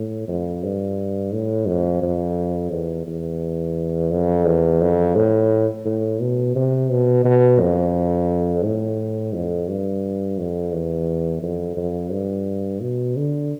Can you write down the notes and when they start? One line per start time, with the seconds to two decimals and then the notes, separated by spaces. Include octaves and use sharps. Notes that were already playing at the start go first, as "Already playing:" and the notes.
Already playing: A2
0.28 F2
0.64 G2
1.32 A2
1.68 F2
2.02 F2
2.71 E2
3.07 E2
4.11 F2
4.45 E2
4.81 F2
5.16 A2
5.85 A2
6.21 B2
6.56 C3
6.90 B2
7.24 B2
7.60 F2
8.64 A2
9.34 F2
9.68 G2
10.38 F2
10.73 E2
11.42 F2
11.77 F2
12.11 G2
12.82 B2
13.17 D3